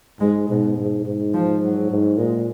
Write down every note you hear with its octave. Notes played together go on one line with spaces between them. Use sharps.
G#2 G#3
G#2 B2
G#2
G#2
F3
F#3
G#2
A#2 G#3